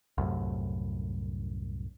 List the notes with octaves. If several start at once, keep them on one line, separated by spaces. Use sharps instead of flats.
C2 F#2 A2